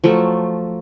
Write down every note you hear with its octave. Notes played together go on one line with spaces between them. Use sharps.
F3 F#3 A3 A4